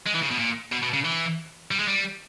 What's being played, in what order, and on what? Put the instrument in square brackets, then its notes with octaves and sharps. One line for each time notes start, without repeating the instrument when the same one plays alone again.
[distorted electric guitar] G#3
E3
C#3
B2
A#2
B2
B2
C#3
E3
G3
G#3
G3